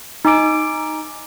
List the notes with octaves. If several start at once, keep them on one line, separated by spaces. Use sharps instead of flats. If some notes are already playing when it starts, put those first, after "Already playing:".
D#4 G#5 D6 D7